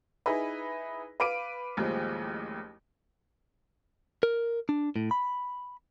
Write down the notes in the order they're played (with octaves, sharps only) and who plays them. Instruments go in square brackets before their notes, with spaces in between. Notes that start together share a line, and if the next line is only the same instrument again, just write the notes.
[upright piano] D#4 E4 G#4 B4
B4 F5 D6 D7 D#7
A1 D#2 F3 G3 G#3
[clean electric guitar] A#4
D4
A2
B5